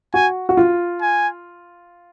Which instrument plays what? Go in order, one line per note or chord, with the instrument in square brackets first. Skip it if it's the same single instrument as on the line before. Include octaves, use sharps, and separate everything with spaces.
[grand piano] F#4 [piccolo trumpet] G#5
[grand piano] F#4
F4
[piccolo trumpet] G#5